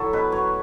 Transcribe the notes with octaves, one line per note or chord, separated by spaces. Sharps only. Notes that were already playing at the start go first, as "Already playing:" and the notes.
Already playing: F#3 E4 F#4 A4
B2 B4
F#3 C#5